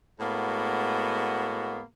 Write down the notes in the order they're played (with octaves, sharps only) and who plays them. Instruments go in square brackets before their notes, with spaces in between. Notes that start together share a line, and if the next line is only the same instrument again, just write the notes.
[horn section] A2 G#3 A#3 B3 F#4